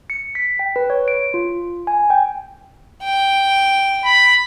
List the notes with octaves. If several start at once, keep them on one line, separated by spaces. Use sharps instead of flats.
C#7
B6
G5
B4
C#5
D7
F4
G#5
G5
G5
B5